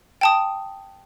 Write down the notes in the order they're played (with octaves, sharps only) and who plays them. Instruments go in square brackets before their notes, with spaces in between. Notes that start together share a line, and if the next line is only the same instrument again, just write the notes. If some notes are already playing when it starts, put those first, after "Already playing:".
[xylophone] G5 A5 D#6